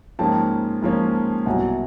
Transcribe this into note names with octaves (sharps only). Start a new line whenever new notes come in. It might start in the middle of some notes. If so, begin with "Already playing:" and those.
G#2 F3 A#3 C#4 G5 A5
G#2 F3 A#3 C#4
C2 B2 F#3 F#5 G#5